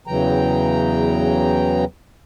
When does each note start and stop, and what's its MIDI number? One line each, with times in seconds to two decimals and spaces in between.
0.07 1.85 40
0.07 1.85 49
0.07 1.85 52
0.07 1.85 54
0.07 1.85 79
0.07 1.85 82